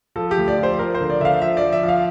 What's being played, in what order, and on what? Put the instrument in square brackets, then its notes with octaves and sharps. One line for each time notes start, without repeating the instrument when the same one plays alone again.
[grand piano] F3 A4
G4
D2
D5
F3
C5
F3 A#4
C5
D3
D5
D3 E5
F5
F3 E5
F3 D5
E5
F3
F5